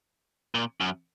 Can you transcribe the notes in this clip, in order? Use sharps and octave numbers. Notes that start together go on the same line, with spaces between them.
A#2
F#2